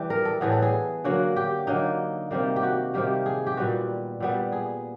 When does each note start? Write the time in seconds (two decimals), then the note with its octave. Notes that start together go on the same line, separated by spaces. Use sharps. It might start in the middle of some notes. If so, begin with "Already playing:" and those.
Already playing: E3 G3 G4
0.10 A#4
0.25 A4
0.41 A2 E3 G3 B3 G#4
0.52 A4
0.62 G#4
1.04 D3 F#3 A#3 F#4
1.36 G4
1.67 D3 F#3 A#3 D#4
2.31 C3 D#3 G3 A#3
2.56 G4
2.63 F#4
2.94 C3 D#3 G3 A#3 G4
3.26 G#4
3.47 G4
3.57 A#2 G3 B3 F#4
4.20 A#2 G3 B3
4.52 G#4